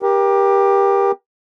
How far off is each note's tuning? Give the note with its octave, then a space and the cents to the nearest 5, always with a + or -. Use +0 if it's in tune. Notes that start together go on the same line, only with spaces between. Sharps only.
G4 +15 A#4 +30